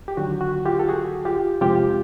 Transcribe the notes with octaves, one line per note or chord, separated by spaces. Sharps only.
G4
D#2 D3 F#3 F#4
F#4
F4 G4
A4
F#4 G#4
F4 G4
F2 C3 F3 G#3 F4 G4